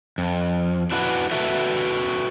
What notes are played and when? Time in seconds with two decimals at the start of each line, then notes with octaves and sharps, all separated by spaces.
0.18 F2
0.92 D4 E4 F#4 B4
1.32 F#4 A4 B4 E5